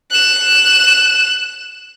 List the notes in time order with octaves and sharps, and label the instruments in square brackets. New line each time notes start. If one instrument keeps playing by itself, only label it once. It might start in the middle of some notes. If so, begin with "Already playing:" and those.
[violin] F#6 E7